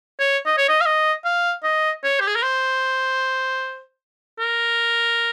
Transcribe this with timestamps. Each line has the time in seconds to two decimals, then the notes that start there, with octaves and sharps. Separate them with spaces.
0.19 C#5
0.46 D#5
0.58 C#5
0.69 D#5
0.81 F5
0.86 D#5
1.25 F5
1.64 D#5
2.04 C#5
2.20 G4
2.28 G#4
2.35 A#4
2.43 C5
4.39 A#4